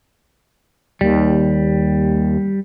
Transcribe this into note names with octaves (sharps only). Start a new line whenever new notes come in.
D#2 G3